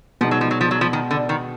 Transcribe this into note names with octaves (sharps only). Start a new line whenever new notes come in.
B2 F3 G#3 D#4
F#3
F3
F#3
F3
F#3
F3
D#3
D3
D#3